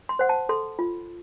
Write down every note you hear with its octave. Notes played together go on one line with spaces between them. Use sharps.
C6
C5 F#5
A5
A4 C6
F4